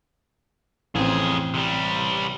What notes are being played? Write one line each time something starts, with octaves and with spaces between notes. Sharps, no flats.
A1 F2 C4 G#4
C3 G3